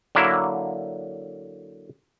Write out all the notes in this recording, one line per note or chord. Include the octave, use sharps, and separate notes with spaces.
D3 F#3 A#3 E4